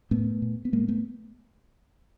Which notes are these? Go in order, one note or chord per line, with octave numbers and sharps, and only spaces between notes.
A2 A3 B3
A#2
B3
A2 G#3 A#3
A3 B3